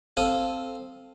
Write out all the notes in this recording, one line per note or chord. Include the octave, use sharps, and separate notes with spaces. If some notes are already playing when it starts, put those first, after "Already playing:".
C4 A4 F5 D#6